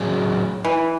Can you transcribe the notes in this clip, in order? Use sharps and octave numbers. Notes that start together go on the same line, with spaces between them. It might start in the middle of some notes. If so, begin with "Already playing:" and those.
Already playing: A2 F#3 C#4 G#4
E3